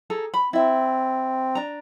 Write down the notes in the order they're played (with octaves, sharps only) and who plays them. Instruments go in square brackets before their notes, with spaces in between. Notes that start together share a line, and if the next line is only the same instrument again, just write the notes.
[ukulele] G#4 A4 A#5
B5
[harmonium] C4 [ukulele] E4 E5
[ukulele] D4 A#5